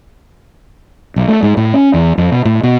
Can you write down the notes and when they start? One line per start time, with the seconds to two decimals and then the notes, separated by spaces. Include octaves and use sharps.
1.16 B1
1.28 A3
1.43 G#2
1.57 A2
1.74 C#4
1.94 E2
2.18 F2
2.32 B2
2.45 A2
2.63 B2